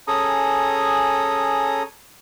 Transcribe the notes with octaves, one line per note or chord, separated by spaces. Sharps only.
C#4 G#4 A4 A#5 D#6